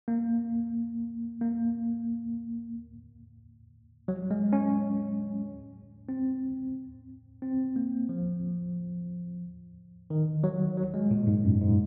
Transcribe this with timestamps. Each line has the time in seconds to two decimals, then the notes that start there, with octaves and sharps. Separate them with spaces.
0.08 A#3
1.41 A#3
4.08 F#3
4.31 G#3
4.53 C#4
6.09 C4
7.42 C4
7.76 A#3
8.09 F3
10.10 D#3
10.44 F#3
10.77 F#3
10.94 G#3
11.11 A#2
11.27 G#2
11.44 F#2
11.61 G#2